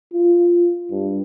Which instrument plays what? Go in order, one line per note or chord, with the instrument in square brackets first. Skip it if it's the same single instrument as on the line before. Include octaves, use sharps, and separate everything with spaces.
[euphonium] F4
G2